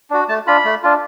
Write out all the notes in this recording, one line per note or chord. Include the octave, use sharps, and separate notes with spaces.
D4 F#4
A3 A5
D4 F4 B5
A3
D4 F4